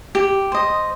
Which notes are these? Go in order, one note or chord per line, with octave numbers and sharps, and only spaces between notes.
G4
C5 D#5